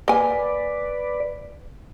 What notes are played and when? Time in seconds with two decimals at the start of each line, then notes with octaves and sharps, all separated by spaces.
0.08 A#3 B4 D5 G#5